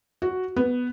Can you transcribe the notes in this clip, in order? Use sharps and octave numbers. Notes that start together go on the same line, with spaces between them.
F#4
B3